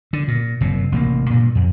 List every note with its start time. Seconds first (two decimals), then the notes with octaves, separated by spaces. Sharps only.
0.13 D3
0.28 A#2
0.61 F#1 C3
0.92 A1 C3 A3 A#3
1.30 G2 A#2
1.55 F2